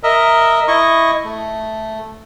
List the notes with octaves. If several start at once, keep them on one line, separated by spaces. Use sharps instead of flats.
A#4 D#5 E5
E4 D#5 C#6
A3